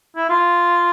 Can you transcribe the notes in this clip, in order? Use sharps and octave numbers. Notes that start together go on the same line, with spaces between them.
E4
F4